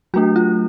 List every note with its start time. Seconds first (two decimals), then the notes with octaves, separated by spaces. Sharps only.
0.14 F#3 A3 D4 F#4
0.36 F4